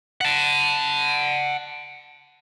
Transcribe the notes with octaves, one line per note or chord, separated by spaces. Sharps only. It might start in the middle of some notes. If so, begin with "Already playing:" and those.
F#5 A5